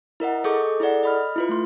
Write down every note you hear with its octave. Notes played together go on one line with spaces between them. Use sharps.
E4 A#4 D#5 F#5
G#4 A4 D#5 C#6 D6 G6
E4 G#4 A4 D5 F#5
D#5 B5 F6
E4 F4 B4
A3 C6